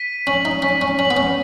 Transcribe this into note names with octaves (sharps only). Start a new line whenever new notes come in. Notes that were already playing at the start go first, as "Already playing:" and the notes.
Already playing: B6 D#7
C#4 F#7
D#4
C#4 B6
C#4
C#4 F#7
B3
C#4